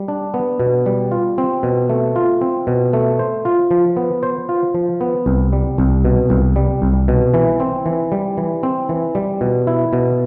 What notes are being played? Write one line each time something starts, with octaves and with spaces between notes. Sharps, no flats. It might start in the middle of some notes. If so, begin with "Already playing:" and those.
Already playing: G3
D4
B3
B2
G3
F4
C4
B2
A3
F4
C4
B2
A3
C5
F4
F3
B3
C5
F4
F3
B3
C2
G3
C2
B2
C2
G3
C2
B2
E3
C4
E3
G3
E3
C4
E3
G3
B2
E4
B2